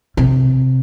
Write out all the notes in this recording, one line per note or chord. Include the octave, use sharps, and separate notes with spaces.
C3